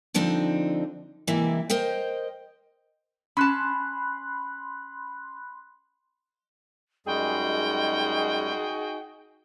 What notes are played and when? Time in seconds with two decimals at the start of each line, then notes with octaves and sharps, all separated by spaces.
0.14 D3 F3 C4 D4 D#4
1.27 C3 E3 G#3 A#3 E4
1.70 A#4 C5 D#5 G5
3.37 C#4 A5 B5 C6 F#6
7.06 F#2 G3 G#3 D#4 F#4 G#4 G5